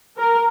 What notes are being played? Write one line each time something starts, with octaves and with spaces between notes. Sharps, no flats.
A#4